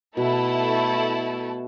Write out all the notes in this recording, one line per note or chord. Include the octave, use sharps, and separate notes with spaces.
B2 A3 E4 A4